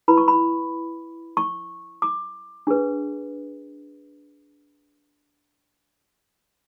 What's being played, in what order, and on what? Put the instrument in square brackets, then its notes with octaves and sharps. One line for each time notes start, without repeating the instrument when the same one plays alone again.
[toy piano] E4 B4 B5
C#6
B5
C#6
D6
D4 G#4 B4